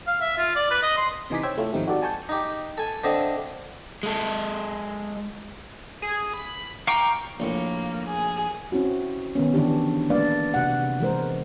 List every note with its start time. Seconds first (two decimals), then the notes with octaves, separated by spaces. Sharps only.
0.07 F5
0.21 E5
0.38 F4
0.56 D5
0.71 B4
0.83 D#5
0.97 C6
1.30 C3 E3 D#4 G#5 D6 B6
1.43 C5 C#5 G5 E6 G#6
1.57 A3 E4 F4 A4 C#5
1.73 G#2 D#3 F3 C4 D#4 G4
1.87 D#4 F#4 G4 A4 D5
2.02 G#5 A5 C#6 G6
2.29 D#4 G4
2.78 A4 G#5
3.04 D3 C4 D#5 E5
4.03 G#3 A4
6.02 G#4
6.34 B5
6.87 F5 G5 A#5 C#6 D6
7.40 A#1 A2 A#3
8.08 G#4
8.72 C4 C#4 E4 F#4
9.35 D#3 B3 C#4
9.54 D3 E3 C4 D4 G4
10.10 G#3 A#3 D4 B4 D5 F5
10.54 C3 F#5
11.00 E3 G#3 A#4 C5